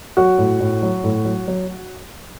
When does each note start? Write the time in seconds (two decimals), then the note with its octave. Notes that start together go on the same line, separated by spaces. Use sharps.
0.17 F#3 F#4
0.38 A2
0.60 A2
0.82 F#3
1.04 A2
1.25 F#3
1.48 F#3